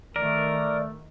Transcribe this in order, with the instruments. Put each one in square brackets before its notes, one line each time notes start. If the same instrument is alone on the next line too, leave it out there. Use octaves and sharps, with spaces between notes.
[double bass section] D#3 [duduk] A3 [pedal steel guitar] A#4 [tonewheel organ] D5